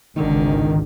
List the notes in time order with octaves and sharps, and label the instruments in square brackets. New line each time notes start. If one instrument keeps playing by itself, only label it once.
[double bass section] G#1 C#2 [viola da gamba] D3 [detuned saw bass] D#3